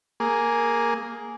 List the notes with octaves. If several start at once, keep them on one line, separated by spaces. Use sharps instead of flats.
A#3 G#4